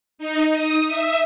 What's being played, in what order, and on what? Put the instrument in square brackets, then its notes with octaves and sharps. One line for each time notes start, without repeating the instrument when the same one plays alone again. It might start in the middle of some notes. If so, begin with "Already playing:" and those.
[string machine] D#4
D#6
E5